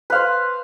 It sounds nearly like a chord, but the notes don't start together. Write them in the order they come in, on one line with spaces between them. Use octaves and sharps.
B4 F5 C5